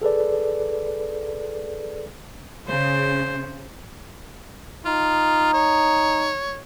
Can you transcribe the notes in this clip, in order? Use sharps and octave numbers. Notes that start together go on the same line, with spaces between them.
G#4 A4 B4 D5
C#3 C5
D#4 F4
C#5